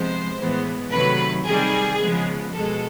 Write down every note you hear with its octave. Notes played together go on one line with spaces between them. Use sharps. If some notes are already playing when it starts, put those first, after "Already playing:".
Already playing: C3 F3 G#3 B3 C5
A2 E3 G#3 B3
C3 D#3 F#3 A3 B4
C3 D#3 G3 G#4
C#3 F3 G#3 B3
B2 G#3 B3 A4